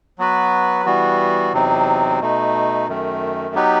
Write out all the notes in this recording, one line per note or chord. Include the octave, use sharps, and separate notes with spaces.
F#3 B3 F#4 B4
E3 G3 B3 F#4
E2 C3 F#3 C4 D#4
B2 A3 D#4
F#2 D#3 A3
F#3 B3 D#4 G4 B4